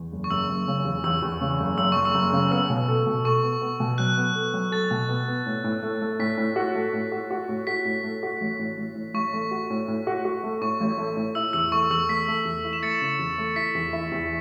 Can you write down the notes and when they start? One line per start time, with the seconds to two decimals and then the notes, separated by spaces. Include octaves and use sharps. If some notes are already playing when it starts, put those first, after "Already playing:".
Already playing: E2
0.12 F#1
0.24 C#6
0.30 F#1 E6
0.49 F#1
0.67 C#3
0.85 E2
1.04 E2 E6
1.22 E2
1.41 C#3
1.60 F#1
1.78 F#1 E6
1.92 F#1 C#6
2.05 E6
2.15 F#1
2.33 C#3
2.51 B3 E6
2.70 B2
2.88 A4
3.07 B2
3.24 A4 C#6
3.44 B3
3.62 B3
3.80 B2
3.98 F#3 F#6
4.18 B3
4.35 A4
4.54 F#3
4.72 A4 A6
4.91 B2
5.09 B3
5.28 B3
5.46 A2
5.64 A2
5.83 A3
6.02 A3
6.19 A2 B6
6.37 A2
6.56 F#4
6.75 A3
6.93 A2
7.12 F#4
7.31 F#4
7.49 A2
7.67 F#4 B6
7.85 A2
8.04 A3
8.23 F#4
8.41 A1
8.59 A2
8.78 A1
8.95 A2
9.14 A1 C#6
9.33 A3
9.51 F#4
9.70 A2
9.88 A2
10.07 F#4
10.25 F#4
10.44 A3
10.61 A2 C#6
10.81 A1
10.98 A3
11.17 A2
11.35 E4 E6
11.53 E2 E6
11.72 A3 C#6
11.90 E2 E6
12.09 A3 B6
12.28 A3
12.45 E2
12.64 E4
12.73 E7
12.82 A3 A6 C#7
13.01 C#3
13.19 E2
13.38 A3
13.56 E4 B6
13.75 E2
13.93 E4
14.12 E2